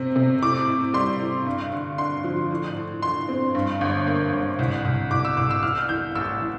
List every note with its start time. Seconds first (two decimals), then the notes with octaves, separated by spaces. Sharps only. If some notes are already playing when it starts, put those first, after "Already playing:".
Already playing: C3 C4
0.16 C3
0.42 A2 D6
0.68 A2
0.94 G3 C6
1.20 A2
1.46 G2
1.73 D3
1.98 D3 C6
2.24 F3
2.51 A2
2.77 A2
3.02 E3 C6
3.29 C4
3.55 G2
3.81 G1
4.07 A#3
4.33 G1
4.59 C2
4.85 C2
5.11 C2 D6
5.25 E6
5.37 C2 D6
5.51 E6
5.63 E3 F6
5.89 E3 G6
6.15 A1 E6
6.42 E3